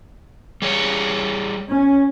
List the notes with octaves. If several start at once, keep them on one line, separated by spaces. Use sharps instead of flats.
G3 G#4 C#5
C#4